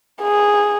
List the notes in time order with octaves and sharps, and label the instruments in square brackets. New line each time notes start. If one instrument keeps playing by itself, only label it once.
[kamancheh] G#4